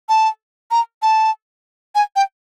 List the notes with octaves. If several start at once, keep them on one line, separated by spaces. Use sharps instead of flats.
A5
A#5
A5
G#5
G5